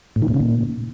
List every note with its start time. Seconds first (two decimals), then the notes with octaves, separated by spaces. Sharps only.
0.16 A2
0.22 D#3
0.28 A#2
0.34 C#3
0.40 A#2